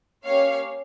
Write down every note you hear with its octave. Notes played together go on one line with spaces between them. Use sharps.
A#3 C#4 G4 C#5 F5